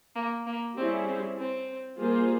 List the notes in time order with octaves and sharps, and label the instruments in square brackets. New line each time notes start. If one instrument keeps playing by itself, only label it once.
[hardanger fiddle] A#3
A#3
[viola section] G3 C#4 E4 G#4 [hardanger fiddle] C4
[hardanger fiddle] C4
C4
[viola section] G3 A#3 F4 G#4 C5